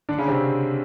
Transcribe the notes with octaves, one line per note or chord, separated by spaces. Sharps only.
D3 D4
C#3 C#4
C3 C4